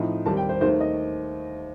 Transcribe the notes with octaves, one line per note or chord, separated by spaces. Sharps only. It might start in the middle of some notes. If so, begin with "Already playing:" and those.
Already playing: A2 F3 C4 D#4
D#2 D#3 G3 C4 A5
G5
C5
D#2 D#3 A3 C5
D#5